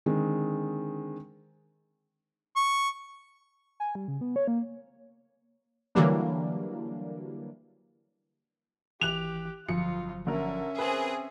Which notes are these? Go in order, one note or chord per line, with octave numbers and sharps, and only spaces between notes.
D3 D#3 G#3 C4
C#6
G#5
G3
C#3
B3
C#5
A#3
D3 E3 F#3 G3 A#3 D4
G#1 E3 G4 F#6 F7
G1 F2 F3 F#3 F4 C#7
D3 C#4 A#4 E5
C4 G#4 A#4 B4 D#6